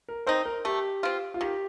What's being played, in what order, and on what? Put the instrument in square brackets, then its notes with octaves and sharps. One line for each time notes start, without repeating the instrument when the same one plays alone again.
[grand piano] A#4
[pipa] C4 D#4 [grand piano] C5
[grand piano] A#4
[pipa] A3 [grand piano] G4
[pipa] C4 F4
[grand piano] F4
[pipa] D#3 [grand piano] G4